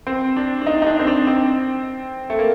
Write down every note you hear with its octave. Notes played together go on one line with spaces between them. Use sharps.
C4
D4
D4
D#4
D#4
D4
C4
D4
C4
A3
A#3